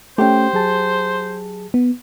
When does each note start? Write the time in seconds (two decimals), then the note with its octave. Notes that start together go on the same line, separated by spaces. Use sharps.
0.18 A3 C#4 G4 C5 G5
0.53 F#3 G#4 A5
1.74 B3